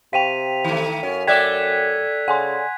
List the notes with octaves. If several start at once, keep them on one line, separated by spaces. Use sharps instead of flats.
C3 F5 G5 B6 D#7 F7
D#3 A3
F#2 C#4
A3 D5 E5 G5 F#6 G#6 B6
C#3 F#5 G#5 C6